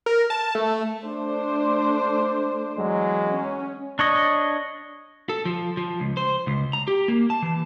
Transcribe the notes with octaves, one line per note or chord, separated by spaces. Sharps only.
A#4
A5
A3
A3 D4 C5
E2 F#3 G#3
C#4
D4 C#5 D#5
A4
F3
F3
C#2
C5
C#2
A#5
G4
A#3
A5
E3